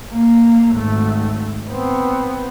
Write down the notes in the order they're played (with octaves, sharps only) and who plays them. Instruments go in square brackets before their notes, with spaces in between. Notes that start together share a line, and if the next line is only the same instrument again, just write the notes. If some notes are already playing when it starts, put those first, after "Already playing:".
[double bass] A#3
G#1 A3
B3 C4